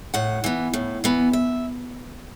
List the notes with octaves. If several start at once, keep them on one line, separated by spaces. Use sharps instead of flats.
A2 F#5
E3 B3
A2
E3 B3
E5